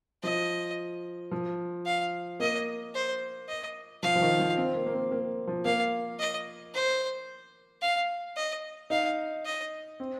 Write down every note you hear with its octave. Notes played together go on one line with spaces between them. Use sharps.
F3 D#5
F3
F5
A#3 D#5
C5
D#5
F3 F5
F3
D#3
F3
C4
A#3
A#3
C4
A#3
F3
A#3 F5
D#5
C5
F5
D#5
D#4 F5
D#5
C4